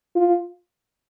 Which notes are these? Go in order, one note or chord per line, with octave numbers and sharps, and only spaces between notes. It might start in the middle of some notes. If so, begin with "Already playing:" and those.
F4